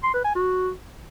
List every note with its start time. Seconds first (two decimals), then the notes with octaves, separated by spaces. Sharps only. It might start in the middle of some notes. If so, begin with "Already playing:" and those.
0.03 C6
0.14 B4
0.25 G#5
0.35 F#4